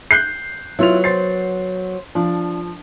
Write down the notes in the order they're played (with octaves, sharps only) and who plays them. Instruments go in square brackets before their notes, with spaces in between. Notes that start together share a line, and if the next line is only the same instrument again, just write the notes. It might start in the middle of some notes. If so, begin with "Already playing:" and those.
[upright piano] F#6 G6 C7
[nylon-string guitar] F#3 B3 [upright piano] E4 F4 F7
[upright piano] C5 A6 C7
[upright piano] F3 [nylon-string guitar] D4